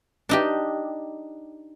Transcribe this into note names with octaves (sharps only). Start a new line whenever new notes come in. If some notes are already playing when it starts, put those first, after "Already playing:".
D4 D#4 G4